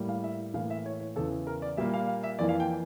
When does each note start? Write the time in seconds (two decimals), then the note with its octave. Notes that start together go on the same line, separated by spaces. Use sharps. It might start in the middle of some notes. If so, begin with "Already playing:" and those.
Already playing: A2 G3 A#3
0.09 F5
0.24 E5
0.54 A2 E3 A#3 F5
0.70 E5
0.86 C#5
1.00 C#5
1.16 E2 C#3 E3 A4
1.47 A#4
1.62 D5
1.77 A#2 G3 A#3 E5
1.94 F5
2.08 F5
2.23 E5
2.39 F2 E3 A#3 D5
2.49 F5
2.60 G5